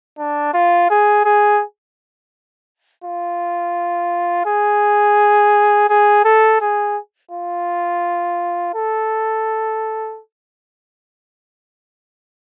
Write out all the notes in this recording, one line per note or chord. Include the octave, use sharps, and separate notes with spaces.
D4
F4
G#4
G#4
F4
G#4
G#4
A4
G#4
F4
A4